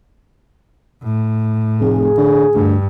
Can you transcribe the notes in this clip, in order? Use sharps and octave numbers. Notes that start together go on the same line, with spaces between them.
A2
F1 G#4
D3
D2 G2